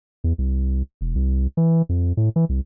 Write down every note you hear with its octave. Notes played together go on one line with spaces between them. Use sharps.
E2
C2
E1
C2
E3
F2
A2
E3
C2